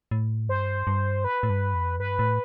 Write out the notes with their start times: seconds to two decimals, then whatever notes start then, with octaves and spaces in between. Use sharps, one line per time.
0.11 A2
0.49 G2 C5
0.87 G2
1.25 B4
1.43 A2
1.50 G2
1.74 F2
1.99 G2 B4
2.19 A2